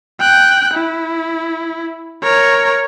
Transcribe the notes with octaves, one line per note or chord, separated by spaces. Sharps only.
G5 F#6
E4
A#4 C#5